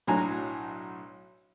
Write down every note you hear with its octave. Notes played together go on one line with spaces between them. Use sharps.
B1 A2 F#3 D4 G#5 A#5